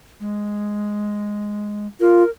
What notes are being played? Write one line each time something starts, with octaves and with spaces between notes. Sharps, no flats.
G#3
F4 A#4